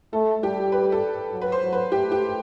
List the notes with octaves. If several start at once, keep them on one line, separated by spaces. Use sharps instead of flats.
A3 A4
G3 G4
B4
A4
F#3
B4
C5
F#3
B4
A3 G4
G4